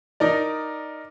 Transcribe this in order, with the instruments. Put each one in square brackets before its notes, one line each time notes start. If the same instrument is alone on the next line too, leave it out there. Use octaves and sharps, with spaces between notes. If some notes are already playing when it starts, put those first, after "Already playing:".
[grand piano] D#4 A#4 D5